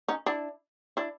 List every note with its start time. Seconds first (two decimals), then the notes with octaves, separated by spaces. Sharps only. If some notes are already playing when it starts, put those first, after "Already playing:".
0.08 C#4 D#4
0.26 D4 E4
0.97 D4 E4